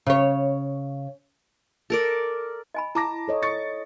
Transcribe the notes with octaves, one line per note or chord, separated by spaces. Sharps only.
C#3 C#5
A4 A#4 D5
D#5 G#5 B5
E4 A5 A#5 D6 A#6
A4 C#5 D#5
C#6 A6 C#7